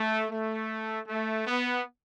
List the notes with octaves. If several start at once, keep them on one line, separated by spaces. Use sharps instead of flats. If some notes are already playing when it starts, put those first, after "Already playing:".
Already playing: A3
A3
A3
B3